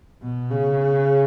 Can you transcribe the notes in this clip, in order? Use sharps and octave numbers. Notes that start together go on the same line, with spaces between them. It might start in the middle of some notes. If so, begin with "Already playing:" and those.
B2
C#3